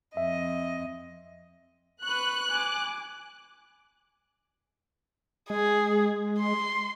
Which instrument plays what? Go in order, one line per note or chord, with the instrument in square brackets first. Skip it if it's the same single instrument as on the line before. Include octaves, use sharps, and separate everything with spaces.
[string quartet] F2 D#5 [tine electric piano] E5
[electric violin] B4 C#6 [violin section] F#6
[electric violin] G#5 D6
[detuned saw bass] G#3 [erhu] G#4
[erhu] C6